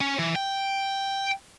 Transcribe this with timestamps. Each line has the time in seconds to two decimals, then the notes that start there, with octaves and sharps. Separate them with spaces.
0.01 C#4
0.19 E3
0.36 G5